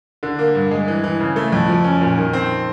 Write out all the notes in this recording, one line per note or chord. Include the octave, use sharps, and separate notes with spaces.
D3
A#3
G2
G#3
E3
E3
C#3
A3
F2
F3
C#4
A#2
D#3
C4